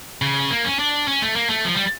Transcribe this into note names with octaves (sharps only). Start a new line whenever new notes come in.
C#3
C#4
A#3
C#4
D4
C#4
A3
A#3
A3
F3
G3